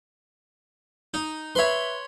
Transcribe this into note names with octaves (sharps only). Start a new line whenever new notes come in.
D#4
B4 C#5 E5 B5 C6